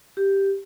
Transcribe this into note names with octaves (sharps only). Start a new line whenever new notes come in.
G4